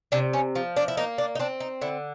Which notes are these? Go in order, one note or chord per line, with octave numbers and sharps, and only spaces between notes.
C3 D4
C#4
F3
D4
E4
A#3 D#4
D4
D#4
C4 D4
D#4
D3 E4